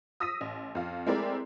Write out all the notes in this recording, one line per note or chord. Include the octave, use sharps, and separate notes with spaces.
D#6 E6 A#6 B6 D#7
A1
F2 F5
G#3 A3 C4 E4 A#4 D5